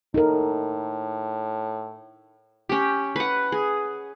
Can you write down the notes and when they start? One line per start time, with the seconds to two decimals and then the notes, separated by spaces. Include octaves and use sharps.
0.14 A2 D#4 A4 A#4
2.69 C#4 G4
3.16 B4 F#5
3.52 G#4